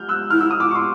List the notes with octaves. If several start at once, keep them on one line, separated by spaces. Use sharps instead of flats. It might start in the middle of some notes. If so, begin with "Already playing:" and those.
Already playing: F6 G6
E6 F#6
E4 F6
E6
D#6
D6 E6
C#6
C6 D6